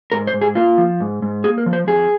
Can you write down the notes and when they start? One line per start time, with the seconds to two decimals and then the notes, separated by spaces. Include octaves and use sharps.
0.12 G#2 A#4
0.27 C5
0.33 G#2
0.41 G#4
0.55 A#3 F4
0.78 F3
1.00 G#2
1.22 G#2
1.44 A#3 G#4
1.58 A#4
1.66 F3
1.73 C5
1.87 F2 G#4